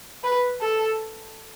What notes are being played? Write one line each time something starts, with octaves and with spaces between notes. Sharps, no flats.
B4
A4